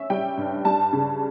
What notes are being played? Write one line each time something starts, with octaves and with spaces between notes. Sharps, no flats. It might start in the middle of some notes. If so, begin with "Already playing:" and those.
Already playing: C#4 E5
G3 G5
G2
G3 A5
C#3